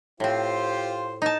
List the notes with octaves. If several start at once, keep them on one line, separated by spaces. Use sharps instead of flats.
A2 C4 F4 G4 C5
D#4 A5